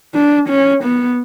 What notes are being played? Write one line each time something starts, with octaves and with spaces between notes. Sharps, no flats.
D4
C#4
B3